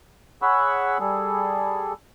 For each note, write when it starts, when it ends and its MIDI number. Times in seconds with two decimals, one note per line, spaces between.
0.42 0.98 68
0.42 0.98 73
0.42 0.98 78
0.42 0.98 83
0.42 0.98 85
0.42 0.98 88
1.00 1.93 55
1.00 1.93 68
1.00 1.93 69